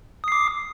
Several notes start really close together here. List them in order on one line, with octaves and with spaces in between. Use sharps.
D#6 C7 D6